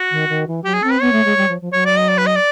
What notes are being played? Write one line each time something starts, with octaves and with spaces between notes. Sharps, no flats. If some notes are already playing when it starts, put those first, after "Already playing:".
Already playing: F#4
D#3
D#3
E3
F#3 G4
G#4
C4 A4
B4
B3 C#5
A3
G#3
G3
F3
F3
F#3 C#5
D5
D#5
D5
B4
D#5
D5